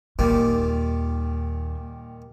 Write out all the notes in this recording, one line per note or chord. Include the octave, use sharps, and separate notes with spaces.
D#2 A#2 D#3 G3 A#3